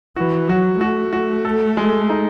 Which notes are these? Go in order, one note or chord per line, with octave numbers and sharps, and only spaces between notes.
E3 F#4
F#3 F#4
A3 F#4
F#4
A4
G#3
D#4